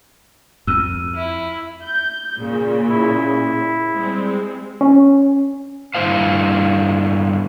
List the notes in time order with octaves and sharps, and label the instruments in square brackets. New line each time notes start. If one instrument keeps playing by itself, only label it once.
[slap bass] F2 [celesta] E6 F6 D#7
[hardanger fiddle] E4
[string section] G6
A#2 C#3
[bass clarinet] E4
[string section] G3 G#3 C4
[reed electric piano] C#4
[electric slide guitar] G2 D3 G#3 E4 C5 F5